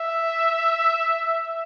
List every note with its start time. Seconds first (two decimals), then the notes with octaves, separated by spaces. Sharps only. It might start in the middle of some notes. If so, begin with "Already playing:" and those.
Already playing: E5